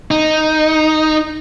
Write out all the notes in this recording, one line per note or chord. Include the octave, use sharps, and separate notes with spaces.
D#4